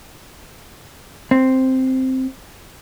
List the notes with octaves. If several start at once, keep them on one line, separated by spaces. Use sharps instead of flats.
C4